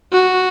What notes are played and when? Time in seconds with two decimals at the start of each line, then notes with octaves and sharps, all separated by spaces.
0.12 F#4